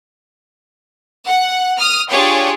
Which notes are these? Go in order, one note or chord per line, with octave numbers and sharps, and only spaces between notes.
F#5
D#6 F6
D4 F4 G4 G#4 C#5